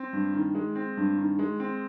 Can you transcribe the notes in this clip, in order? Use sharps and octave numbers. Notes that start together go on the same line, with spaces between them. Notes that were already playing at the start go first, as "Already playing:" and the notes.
Already playing: C4
G2
D#3
G#3
C4
G2
D#3
G#3
C4